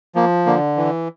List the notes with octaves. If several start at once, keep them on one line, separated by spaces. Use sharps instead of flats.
F3 A#3
D3 A#3
E3